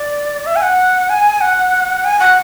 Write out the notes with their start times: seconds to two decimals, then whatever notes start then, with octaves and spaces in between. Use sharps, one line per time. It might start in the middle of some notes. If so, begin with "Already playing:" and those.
Already playing: D5
0.46 E5
0.56 G#5
0.62 F#5
1.09 G#5
1.41 F#5
2.04 G#5
2.19 F#5